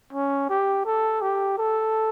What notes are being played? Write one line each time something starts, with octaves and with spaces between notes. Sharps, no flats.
C#4
G4
A4
G4
A4